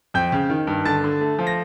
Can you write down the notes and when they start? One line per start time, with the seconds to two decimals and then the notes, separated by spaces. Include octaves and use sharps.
0.14 F2 G5 G6
0.32 C#3
0.50 D#3
0.67 G2
0.85 D3 A5 A6
1.04 D3
1.21 A3
1.39 F3
1.47 A#6